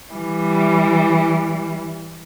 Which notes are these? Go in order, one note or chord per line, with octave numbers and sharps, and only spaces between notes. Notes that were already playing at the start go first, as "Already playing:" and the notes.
E3 G3